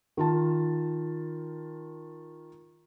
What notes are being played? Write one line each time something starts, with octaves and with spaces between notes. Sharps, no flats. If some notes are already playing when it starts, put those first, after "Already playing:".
D#3 F4 A5